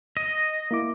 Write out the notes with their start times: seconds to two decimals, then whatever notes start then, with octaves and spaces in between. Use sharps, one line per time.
0.17 D#5
0.71 A#3 E4 D6